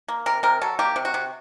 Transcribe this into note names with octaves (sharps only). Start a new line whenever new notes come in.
A#3
C3 A#4
C3 A#4
F#3 A4
A#3 G4
C3
F#4
C3